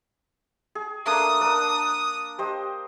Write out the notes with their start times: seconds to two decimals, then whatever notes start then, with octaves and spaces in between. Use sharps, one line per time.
0.75 G#4
1.06 A3 A#3 D4 D#6
1.41 D4 A#4
2.38 G4 C5 D#5